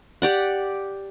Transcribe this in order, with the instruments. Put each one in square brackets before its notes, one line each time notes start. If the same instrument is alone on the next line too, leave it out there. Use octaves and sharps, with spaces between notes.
[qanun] G4 D5 F#5